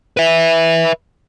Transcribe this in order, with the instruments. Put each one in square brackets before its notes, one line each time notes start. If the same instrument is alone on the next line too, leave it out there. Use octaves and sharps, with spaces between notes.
[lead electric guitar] B4 E5